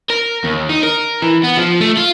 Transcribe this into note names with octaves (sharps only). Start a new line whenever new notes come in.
A#4
D#2
D#4
A#4
E3
B3
F3
A3
F4